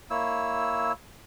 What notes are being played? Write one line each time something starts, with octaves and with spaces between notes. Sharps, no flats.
A#3 E4 C#5 E6